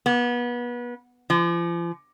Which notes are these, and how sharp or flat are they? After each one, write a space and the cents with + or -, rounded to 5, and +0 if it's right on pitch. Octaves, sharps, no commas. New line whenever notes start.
B3 -30
F3 -40